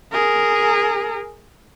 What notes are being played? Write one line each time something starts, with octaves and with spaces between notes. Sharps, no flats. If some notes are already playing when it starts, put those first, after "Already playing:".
G#4 A#4